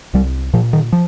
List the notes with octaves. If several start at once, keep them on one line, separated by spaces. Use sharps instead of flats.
C2 G3
A#2 F3
D#3
F3